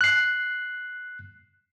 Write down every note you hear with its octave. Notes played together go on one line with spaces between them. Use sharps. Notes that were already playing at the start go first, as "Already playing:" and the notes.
F#6 C7